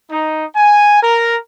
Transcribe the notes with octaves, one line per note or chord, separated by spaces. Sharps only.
D#4
G#5
A#4